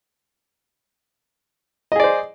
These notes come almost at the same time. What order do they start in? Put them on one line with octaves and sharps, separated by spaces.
D#5 G#4 D5 C5